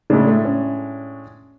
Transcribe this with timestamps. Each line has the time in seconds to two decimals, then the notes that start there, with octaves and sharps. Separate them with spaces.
0.10 A2 C#3 G#3 D4
0.27 A3
0.45 C#4